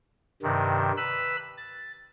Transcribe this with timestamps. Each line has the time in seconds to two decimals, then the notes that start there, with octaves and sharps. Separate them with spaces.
0.43 G2 C3 D#3
0.97 B4 B5 E6
1.57 A6